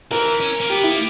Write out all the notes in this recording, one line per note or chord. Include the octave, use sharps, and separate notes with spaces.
E3 A#4
C#4
A#3
B3 G4
E4
A#3